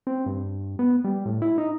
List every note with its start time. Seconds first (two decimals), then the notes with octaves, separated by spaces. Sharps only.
0.07 C4
0.26 G2
0.79 B3
1.04 G3
1.26 A2
1.42 E4
1.58 D#4